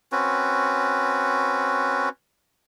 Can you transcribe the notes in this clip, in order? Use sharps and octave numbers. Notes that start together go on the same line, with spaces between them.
C4 C#4 F#4 B4